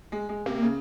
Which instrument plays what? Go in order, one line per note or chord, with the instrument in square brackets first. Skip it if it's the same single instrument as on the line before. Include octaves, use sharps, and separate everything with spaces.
[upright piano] G#3
G#3
[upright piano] C3 [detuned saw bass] A#3
[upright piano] C#3